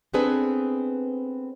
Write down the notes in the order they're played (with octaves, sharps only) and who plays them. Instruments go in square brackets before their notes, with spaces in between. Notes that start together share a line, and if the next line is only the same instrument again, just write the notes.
[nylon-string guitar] B3 C4 D4 G#4 A4 B4